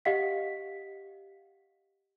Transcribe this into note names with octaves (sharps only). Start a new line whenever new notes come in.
G4 D#5 F5 F#5 B6